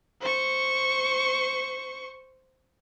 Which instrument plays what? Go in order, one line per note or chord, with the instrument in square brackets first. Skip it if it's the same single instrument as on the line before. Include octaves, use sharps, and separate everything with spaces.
[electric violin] C5 C#6